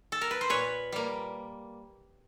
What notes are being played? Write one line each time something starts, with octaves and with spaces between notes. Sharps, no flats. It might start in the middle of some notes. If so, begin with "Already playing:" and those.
A4
A#4
B4
C5
A#2 B4 C#5
G3 A#3